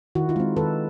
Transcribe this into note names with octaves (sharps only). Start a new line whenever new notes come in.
D#3 E4 F#4
D#4 F4
G#3 C4
D#3 A4 B4